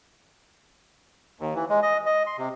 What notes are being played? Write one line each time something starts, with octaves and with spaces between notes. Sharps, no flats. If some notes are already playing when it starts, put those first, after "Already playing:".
D#2
E3
G#3
D#5
D#5
C6
C3